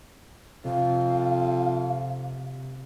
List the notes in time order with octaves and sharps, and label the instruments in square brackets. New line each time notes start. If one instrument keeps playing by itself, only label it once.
[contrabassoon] F2 [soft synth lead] C3 [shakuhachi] F5